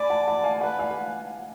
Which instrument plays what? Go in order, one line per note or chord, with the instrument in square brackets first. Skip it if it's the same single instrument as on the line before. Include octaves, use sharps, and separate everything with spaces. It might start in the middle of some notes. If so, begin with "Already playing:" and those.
Already playing: [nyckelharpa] D5 [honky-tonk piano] G#5 B5
[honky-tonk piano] F#5 A5
F#5 A5
F5 G#5
[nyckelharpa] B4 [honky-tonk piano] D5 F#5
[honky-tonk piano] F5 G#5